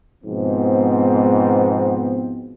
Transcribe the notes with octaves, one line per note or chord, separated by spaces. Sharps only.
G#2 B2 F3 B3 C4